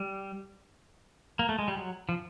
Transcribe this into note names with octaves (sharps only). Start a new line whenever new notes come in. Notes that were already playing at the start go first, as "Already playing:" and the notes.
Already playing: G3
A#3
A3
G#3
G3
F#3
F3